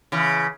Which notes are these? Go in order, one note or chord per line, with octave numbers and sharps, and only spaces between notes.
C#3 E3